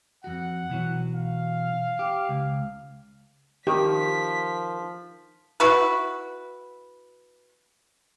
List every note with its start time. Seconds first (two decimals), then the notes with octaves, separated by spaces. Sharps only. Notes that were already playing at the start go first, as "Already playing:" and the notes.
0.24 F2 F#4 F#5
0.70 B2 E3 F#3
1.14 F5
1.99 G4
2.29 C#2
3.67 D#3 F3 G4 B6
5.60 E4 F#4 B4